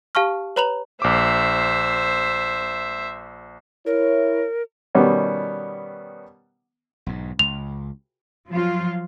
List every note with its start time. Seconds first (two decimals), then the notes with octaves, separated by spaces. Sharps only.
0.15 G4 F5 A5 C#6 F6
0.56 B4 C#5 A#5 B5 F7 F#7
1.02 A#1 C5 E5 D6
3.86 E4 A#4 C#5
4.95 B2 D#3 G3 B3 C#4
7.07 B1 G#2
7.39 C#2 F7
8.48 F3 F#3 F4